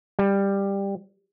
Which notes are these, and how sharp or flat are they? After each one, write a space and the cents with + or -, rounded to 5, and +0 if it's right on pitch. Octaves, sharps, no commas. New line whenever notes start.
G3 +15